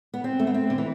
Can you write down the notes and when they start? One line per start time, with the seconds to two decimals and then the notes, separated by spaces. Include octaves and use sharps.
0.14 B3
0.24 C4
0.40 A3
0.47 B3
0.54 C4
0.70 D3
0.78 E3